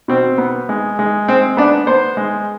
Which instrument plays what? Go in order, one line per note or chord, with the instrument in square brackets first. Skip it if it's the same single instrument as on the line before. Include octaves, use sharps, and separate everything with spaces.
[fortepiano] B2 C4
B3
G#3
G#3
G#3 C4
B3 D4
B3 C5
G#3